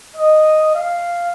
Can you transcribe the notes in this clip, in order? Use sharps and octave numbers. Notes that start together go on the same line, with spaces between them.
D#5
F5